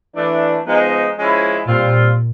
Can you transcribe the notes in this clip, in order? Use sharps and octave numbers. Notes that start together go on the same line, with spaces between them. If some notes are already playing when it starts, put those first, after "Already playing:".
E3 A3 D4
F3 G#3 B3 D#4
F3 G#3 C#4 E4
A#2 G3 C4 F4